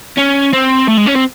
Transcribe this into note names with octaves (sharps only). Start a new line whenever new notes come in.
C#4
C4
A3
G#3
C#4
C4